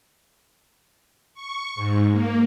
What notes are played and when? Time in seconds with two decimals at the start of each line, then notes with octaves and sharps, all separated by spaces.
1.34 C#6
1.75 G#2
2.12 A#3